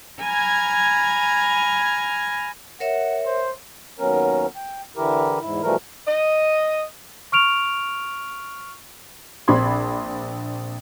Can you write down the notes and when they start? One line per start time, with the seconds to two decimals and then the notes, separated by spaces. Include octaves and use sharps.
0.23 G#5 A#5 B5 F6 G#6
2.80 A#4 C#5 E5 F#5
3.26 C5
3.99 D#2 F#3 B3 C#4 A#4
4.56 G5
4.96 D3 E3 E4 G4 A#4
5.41 E2 G#2 E4
5.63 B2 E3 F3 G3 A3 A#4
6.06 D#5
7.32 C#6 F6 D7 F7
9.48 A#1 C4 D4 B5 C6 G#6